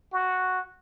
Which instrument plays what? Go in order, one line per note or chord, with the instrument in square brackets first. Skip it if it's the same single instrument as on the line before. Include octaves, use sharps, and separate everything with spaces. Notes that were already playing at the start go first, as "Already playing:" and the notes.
[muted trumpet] F#4